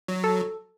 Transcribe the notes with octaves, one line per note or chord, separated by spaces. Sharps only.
F#3
A4